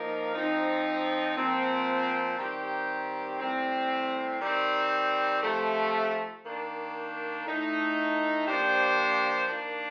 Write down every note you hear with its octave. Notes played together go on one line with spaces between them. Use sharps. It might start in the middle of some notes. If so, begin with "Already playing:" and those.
Already playing: F3 A#3 D#4 A#4
F3 C4 D#4
A#2 F3 C4
D#3 G3 C4 G4
A2 G3 C4
D#3 G3 C4
C3 F3 A3
D#3 A#3 D4
A2 A3 D#4
F3 A#3 D4 G4 C5
D#3 A#3 D4